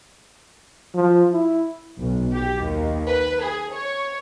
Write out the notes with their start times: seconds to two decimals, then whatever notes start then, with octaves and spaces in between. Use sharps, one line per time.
0.95 F3
1.32 E4
2.00 B1
2.34 G4
2.65 D#2
3.09 B4
3.43 G#4
3.73 C#5